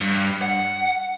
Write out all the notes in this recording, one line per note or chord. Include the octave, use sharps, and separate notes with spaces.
G2
F#5